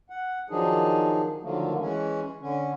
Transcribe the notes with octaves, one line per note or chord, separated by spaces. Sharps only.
F#5
D#3 F3 F#3 D4 D#4 G#4
D3 D#3 F3 F#3 A3 A#3
E3 G#3 C#4
D3 C#4